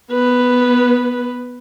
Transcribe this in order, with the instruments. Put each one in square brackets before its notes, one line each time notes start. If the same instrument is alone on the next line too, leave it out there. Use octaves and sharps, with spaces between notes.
[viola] B3 B4